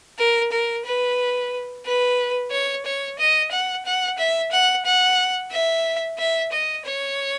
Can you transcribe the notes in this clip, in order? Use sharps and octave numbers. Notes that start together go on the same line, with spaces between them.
A#4
A#4
B4
B4
C#5
C#5
D#5
F#5
F#5
E5
F#5
F#5
E5
E5
D#5
C#5